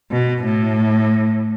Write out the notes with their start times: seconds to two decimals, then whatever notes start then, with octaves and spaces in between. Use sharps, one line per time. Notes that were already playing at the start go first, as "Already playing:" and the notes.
0.11 B2
0.44 A2